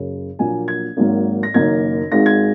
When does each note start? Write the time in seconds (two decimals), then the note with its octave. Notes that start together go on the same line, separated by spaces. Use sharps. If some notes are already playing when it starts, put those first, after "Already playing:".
Already playing: F#1 F#2 C#3
0.39 A#1 A#2 F#3 A#3 G#5
0.68 G#6
0.97 G#1 G#2 F#3 A#3
1.43 A#6
1.54 F#1 F#2 D#3 A#3 G#6
2.12 G#1 G#2 G#3 A#6
2.26 G#6